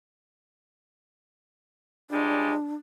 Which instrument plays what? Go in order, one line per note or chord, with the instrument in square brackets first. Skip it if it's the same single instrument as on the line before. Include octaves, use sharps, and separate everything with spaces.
[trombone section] C#2 G3 G#3 [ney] D4